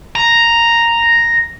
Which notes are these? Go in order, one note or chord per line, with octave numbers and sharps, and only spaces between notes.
A#5